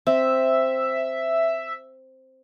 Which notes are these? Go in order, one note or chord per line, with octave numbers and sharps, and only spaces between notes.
C4 E5